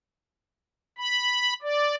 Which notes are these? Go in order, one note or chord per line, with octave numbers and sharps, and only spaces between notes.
B5
D5